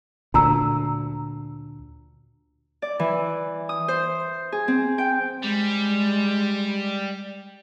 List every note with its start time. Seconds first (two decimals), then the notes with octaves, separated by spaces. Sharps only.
0.34 D2 A#2 A5 A#5 E6
2.82 D5
2.99 E3
3.69 D#6
3.88 C5
4.52 G#4
4.68 C4
4.98 G5
5.42 G3 G#3